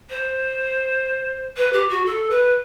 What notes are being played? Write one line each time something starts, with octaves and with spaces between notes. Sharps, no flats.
C5
B4
G4
F#4
A4
B4